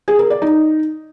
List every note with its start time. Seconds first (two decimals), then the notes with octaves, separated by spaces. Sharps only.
0.08 G#4
0.19 A#4
0.30 D5
0.42 D#4